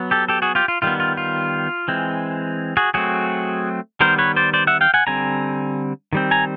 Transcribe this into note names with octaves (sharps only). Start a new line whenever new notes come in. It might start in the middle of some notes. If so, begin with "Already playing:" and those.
Already playing: F#3 B3
G4 A4
G4 A4
F#4 G#4
F4 G4
F4
D#3 G3 B3 F4
F4
F4
E3 G#3 C4
F#4 G#4
F#3 A3 C4 F#4 G#4
D#3 G3 B3 A#4 C5
B4 C#5
C5 D5
C5 D5
E5 F#5
F5 G5
F#5 G#5
D3 G3 C4 G#5 A#5
D#3 G3 C4
G#5 A#5